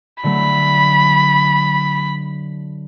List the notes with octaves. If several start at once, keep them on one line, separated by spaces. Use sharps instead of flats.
D3 F#3 A3 B5